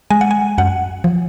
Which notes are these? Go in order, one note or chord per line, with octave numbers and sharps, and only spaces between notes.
G#3 G#5
F#5
G#5
F#2 F#5
F3